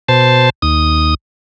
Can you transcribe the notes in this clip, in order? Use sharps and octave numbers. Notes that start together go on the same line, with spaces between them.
B2 C5 A5
D#2 D#6